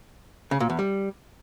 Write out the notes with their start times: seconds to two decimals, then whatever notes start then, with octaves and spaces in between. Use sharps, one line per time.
0.51 C#3
0.60 A#2
0.70 E2
0.79 G3